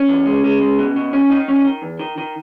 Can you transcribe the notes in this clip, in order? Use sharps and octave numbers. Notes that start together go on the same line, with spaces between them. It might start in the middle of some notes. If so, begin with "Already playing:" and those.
Already playing: C#4
E2
G#3
G#3
G#3
B2
B2
C#4
D#3 D#4
C#4
D#3
E2
D#3
D#3